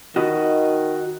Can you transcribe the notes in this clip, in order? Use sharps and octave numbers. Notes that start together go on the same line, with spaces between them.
D#3 F#4 D#5